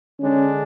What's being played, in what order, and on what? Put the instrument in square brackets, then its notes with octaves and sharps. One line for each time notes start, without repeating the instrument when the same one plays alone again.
[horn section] D3 G#3 D4 [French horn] C#4